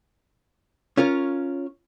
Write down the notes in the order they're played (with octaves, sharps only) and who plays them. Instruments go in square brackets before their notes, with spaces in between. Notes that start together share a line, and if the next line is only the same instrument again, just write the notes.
[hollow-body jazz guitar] C#4 F4 A#4 C#5